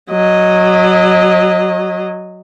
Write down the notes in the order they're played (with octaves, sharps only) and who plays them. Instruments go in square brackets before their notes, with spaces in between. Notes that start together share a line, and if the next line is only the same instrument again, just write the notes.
[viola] F#3 D#5